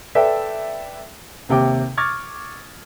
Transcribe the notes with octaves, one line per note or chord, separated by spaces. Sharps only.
A4 B4 D5 E5 G5
D#2 C3 G5 D6
C#6 D6 F6 G#6 A6